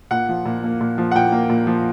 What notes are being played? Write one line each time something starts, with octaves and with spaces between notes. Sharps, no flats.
A#2 F#5
F3
A#2
A#3
A#2
F3
F#5
A#2 G5
A#3
A#2
F3